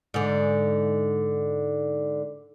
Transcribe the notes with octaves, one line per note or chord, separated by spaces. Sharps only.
G#2 D3